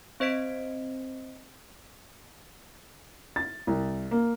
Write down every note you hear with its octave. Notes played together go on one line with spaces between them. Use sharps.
C4 C5 D#5 B6 D7
A6
C2
A#3